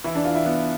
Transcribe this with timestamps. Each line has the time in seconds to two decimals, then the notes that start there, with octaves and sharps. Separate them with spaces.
0.04 E3 E4
0.15 D4
0.24 E3 F4
0.35 E4
0.45 B3 E4